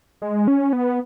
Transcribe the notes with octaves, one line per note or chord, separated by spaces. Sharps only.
G#3
C#4
B3